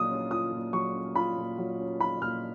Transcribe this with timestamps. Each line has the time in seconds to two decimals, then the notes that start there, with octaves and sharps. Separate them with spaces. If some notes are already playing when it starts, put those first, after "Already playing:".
Already playing: A#2 F#3 F4 D#6
0.10 C#4
0.31 F4 D#6
0.52 A#2
0.73 F#3 C#6
0.95 C#4
1.16 F4 B5
1.37 A#2
1.58 F#3
1.79 C#4
2.00 F4 B5
2.22 A#2 F6